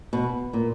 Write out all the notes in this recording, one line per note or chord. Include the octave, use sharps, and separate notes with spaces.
B2
A#2